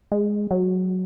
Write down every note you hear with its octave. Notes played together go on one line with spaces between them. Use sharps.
G#3
F#3